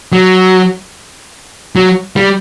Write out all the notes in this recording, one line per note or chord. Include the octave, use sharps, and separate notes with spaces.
F#3
F#3
G3